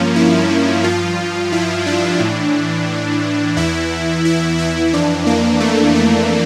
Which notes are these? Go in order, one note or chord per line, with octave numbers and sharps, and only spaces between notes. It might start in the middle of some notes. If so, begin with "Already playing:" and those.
Already playing: G2 F3 A#3 C#4
E4
G2 F3 F4
E4
D4
A2 E3
E2 E3 E4
E4
E4
F2 E3 D4
A#3
A3
A3